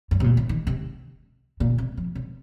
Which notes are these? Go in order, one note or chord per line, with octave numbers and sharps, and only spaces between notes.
G2
C3
A#2
C3
D#3
C3
A#2
C3
F3
C3